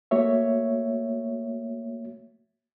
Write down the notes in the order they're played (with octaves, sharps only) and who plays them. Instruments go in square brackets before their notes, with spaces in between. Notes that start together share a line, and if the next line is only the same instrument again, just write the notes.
[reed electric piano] A3 A#3 F#4 C#5 E5